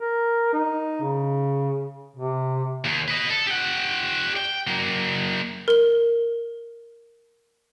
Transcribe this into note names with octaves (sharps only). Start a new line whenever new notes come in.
A#4
D#4
C#3
C3
D#2
B4 D#5
A4
G4 F#5
G5
F#3 A#3
A#4 G7